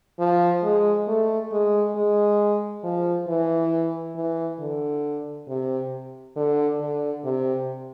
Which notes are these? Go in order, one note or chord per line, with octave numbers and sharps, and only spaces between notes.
F3
G#3
A3
G#3
G#3
F3
E3
E3
D3
C3
D3
D3
C3